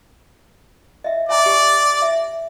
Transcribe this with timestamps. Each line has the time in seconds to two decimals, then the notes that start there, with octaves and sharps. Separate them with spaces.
1.04 D#5 E5
1.29 D5 E5 G#5 A#5
1.46 G4
2.02 E5